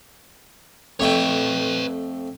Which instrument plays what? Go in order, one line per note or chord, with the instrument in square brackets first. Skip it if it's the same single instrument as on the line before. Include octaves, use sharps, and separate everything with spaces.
[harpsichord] F2 A3 G5 [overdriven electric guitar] B4 C#5